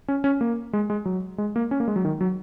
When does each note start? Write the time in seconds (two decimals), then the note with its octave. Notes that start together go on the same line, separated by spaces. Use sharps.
0.08 C#4
0.24 C#4
0.41 A#3
0.73 G#3
0.90 G#3
1.05 F#3
1.38 G#3
1.56 A#3
1.71 C#4
1.80 A#3
1.88 G#3
1.96 F#3
2.05 D#3
2.21 F#3